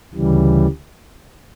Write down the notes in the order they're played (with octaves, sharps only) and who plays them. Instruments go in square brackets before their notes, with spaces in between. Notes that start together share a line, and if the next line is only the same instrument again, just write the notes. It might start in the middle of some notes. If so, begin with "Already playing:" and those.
[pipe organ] D2 C#3 E3 G3